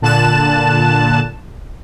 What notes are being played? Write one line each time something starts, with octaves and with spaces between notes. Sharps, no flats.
A#2 D3 A5 F#6 E7